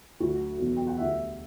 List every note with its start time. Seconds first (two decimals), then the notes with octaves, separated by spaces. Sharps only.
0.20 D2 D3 F#3 F#4
0.58 E2 B2 F#3
0.77 G5
0.87 F#5
0.98 D2 D3 G3 E5